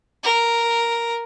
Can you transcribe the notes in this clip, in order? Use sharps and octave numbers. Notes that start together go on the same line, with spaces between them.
A#4